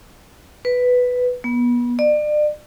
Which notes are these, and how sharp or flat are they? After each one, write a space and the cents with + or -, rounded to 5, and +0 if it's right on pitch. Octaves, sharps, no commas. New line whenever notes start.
B4 +5
B3 -30
D5 +35